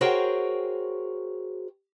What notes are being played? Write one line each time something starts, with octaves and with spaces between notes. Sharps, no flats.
F#4 G#4 A#4 C5 C#5 G5